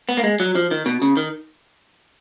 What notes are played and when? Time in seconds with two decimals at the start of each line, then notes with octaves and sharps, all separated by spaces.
0.09 B3
0.17 A#3
0.24 G#3
0.40 F#3
0.55 F3
0.71 D#3
0.86 B2
1.02 C#3
1.17 D#3